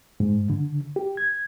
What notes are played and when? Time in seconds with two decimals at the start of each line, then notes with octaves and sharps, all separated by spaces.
0.20 G#2
0.50 D3
0.96 G4
1.17 G#6